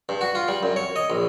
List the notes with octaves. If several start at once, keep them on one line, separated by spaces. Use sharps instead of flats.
G2
F#4
F4
G3
F#2
C#5
D#5
A#1